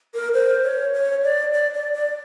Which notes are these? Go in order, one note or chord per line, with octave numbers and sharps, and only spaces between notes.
A#4
C5
C#5
C#5
D5
D5
D5
D5